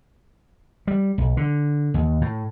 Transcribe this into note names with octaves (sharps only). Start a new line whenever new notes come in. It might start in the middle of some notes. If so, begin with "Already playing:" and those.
G3
B1
D3
D#2
A2